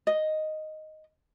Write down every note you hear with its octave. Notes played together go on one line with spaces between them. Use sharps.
D#5